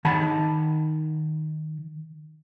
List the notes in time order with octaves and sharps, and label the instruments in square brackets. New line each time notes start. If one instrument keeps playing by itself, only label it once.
[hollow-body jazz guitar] D#3 F#5 A5 B5